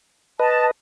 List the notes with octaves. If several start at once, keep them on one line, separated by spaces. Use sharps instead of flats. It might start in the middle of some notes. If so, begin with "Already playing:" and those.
B4 D#5 A5